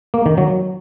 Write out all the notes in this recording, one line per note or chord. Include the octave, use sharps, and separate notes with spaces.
A#3
D#3
F#3